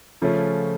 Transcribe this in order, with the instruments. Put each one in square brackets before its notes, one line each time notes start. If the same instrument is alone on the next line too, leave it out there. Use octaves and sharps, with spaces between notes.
[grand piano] C#3 F3 A3 C#4 F4